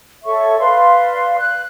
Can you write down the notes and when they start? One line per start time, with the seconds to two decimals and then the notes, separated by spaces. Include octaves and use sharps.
0.25 A4 C#5 E5 C#6
0.59 B4 D5 F5 C6
1.38 F#6